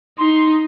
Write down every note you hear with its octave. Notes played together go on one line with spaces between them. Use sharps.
D#4 C6